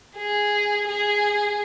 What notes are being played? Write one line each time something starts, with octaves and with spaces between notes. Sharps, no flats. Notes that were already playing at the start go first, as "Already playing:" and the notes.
G#4
G#4